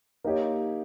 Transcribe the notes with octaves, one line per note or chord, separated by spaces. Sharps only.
A#3 D#4 G4 C#5